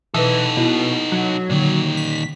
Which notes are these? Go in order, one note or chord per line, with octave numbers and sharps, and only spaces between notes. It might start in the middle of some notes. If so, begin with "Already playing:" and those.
B2 E3 D#4 A4 B4
B2 E4
F#3
A#2 D3 D#3
B6